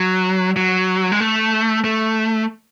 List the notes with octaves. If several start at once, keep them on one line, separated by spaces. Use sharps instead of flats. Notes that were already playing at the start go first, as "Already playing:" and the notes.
Already playing: F#3
F#3
G#3
A3
A3